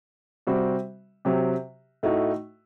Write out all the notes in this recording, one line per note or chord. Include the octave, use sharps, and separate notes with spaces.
C3 G3 C4 F#4
C3 F#3 C4 G4
A2 A3 D#4 F#4